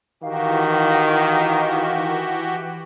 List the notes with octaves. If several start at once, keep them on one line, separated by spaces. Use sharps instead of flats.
D#3 E3 F#4 G4 F5